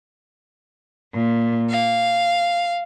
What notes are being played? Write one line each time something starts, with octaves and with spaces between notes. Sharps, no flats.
A#2
F5